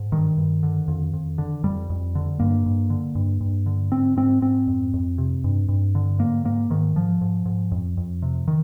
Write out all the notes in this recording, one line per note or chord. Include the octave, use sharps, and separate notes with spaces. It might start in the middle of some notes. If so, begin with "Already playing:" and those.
Already playing: G#2
G2 D#3
G2
D3
F2
F2
D3
F2 G3
F2
D3
G2 A#3
G2
D3
G2
G2
D3
G#2 C4
G#2 C4
G#2 C4
F2
F2
C3
G2
G2
D3
G#2 A#3
G#2 A#3
G#2 D#3
G#2 F3
G#2
G#2
F2
F2
C3
D#3